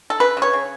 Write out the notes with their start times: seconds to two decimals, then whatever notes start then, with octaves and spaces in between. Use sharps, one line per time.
0.10 A4
0.20 C#3 B4
0.37 C#3
0.42 C#5
0.53 C#3